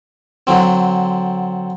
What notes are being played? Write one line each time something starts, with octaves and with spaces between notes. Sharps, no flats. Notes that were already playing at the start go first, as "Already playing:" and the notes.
D3 F#3 C4